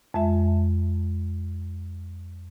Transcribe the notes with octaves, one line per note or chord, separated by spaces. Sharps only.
F2 G#3 E5